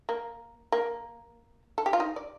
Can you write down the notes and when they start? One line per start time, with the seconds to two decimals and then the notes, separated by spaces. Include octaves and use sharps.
0.09 A#3
0.72 A#3
1.78 A4
1.86 G4
1.93 F4
2.00 D#4
2.16 D5